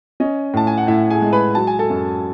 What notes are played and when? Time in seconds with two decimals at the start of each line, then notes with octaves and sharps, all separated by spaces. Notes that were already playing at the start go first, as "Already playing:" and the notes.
0.20 C#4 D#5
0.54 A2 A5
0.67 G#5
0.78 F#5
0.87 A2 E4 E5
1.10 G#4 G#5
1.22 G#3
1.33 B4 B5
1.55 F#3 A5
1.67 G#5
1.79 A4 A5
1.90 F#2